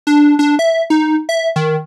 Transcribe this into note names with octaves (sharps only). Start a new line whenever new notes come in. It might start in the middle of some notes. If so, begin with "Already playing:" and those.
D4
D4
E5
D#4
E5
D#3